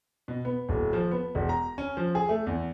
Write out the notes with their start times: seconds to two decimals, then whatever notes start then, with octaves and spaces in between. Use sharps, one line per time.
0.28 B2
0.45 B3
0.69 D#1
0.93 F3
1.11 B3
1.35 E1
1.49 A#5
1.78 C#4
1.97 F3
2.15 G#4
2.29 A3
2.46 E2